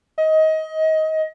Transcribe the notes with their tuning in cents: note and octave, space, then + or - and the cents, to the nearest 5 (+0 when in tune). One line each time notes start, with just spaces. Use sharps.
D#5 +25